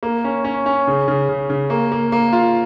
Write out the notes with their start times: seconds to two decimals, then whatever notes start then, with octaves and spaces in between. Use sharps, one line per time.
0.03 A#3
0.24 C#4
0.44 C#4
0.66 C#4
0.87 C#3
1.08 C#3
1.29 C#3
1.50 C#3
1.70 A#3
1.92 A#3
2.12 A#3
2.33 F4